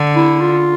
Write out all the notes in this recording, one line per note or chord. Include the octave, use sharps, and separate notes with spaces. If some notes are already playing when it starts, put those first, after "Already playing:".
Already playing: D3
E4
F4